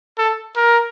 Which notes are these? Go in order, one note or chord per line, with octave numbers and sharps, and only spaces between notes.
A4
A#4